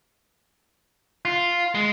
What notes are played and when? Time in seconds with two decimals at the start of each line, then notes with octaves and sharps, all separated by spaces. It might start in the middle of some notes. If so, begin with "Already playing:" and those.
1.25 F4
1.75 G#3